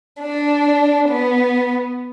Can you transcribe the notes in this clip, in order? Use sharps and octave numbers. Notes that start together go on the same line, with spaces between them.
D4
B3